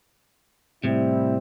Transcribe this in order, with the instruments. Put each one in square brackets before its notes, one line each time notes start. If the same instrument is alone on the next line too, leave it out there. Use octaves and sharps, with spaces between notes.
[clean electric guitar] A2 C3 [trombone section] G3 C4 E4